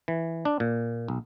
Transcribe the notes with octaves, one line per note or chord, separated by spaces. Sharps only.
E3
D4
A#2
B1